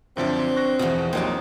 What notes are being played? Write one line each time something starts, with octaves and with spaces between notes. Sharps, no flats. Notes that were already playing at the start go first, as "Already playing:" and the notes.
F#2 D3 F3 C4 D4 A4 E5
C#6 F#6 A#6
E2 B2 F3 F#4 E5 F#5
A#1 F#3 A#3 C4 D#4 G4 A5